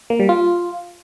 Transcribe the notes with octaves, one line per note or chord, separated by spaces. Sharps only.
A#3
G3
F4